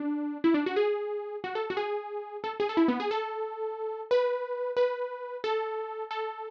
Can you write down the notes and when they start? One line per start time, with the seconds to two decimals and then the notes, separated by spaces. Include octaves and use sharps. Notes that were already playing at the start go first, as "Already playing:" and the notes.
Already playing: D4
0.44 E4
0.54 D4
0.66 F#4
0.76 G#4
1.44 F#4
1.55 A4
1.70 F#4
1.77 G#4
2.44 A4
2.60 G#4
2.69 A4
2.77 E4
2.88 B3
3.00 G#4
3.11 A4
4.11 B4
4.77 B4
5.44 A4
6.11 A4